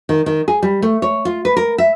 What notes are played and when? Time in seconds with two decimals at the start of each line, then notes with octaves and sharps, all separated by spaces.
0.09 D#3
0.26 D#3
0.48 G#4
0.63 G3
0.82 A3
1.02 C#5
1.25 F4
1.45 B4
1.57 A#4
1.78 E5